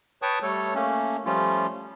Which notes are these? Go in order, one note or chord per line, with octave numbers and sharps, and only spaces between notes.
B4 C#5 G5 A5 C#6 D#6
G3 A3 A4 C#5
A3 A#3 C#4
F3 G3 A3 C#4 F4